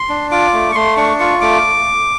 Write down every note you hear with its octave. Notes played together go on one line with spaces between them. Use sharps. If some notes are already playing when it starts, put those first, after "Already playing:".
Already playing: C6
D4
F4 D6
A3
C#6
A3 C6
D4 C#6
F4 C#6
A3 D6